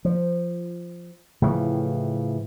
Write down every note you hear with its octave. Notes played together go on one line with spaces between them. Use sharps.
F3
A2 C#3 E3 F3